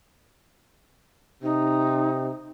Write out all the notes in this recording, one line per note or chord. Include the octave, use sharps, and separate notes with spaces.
C3 D#4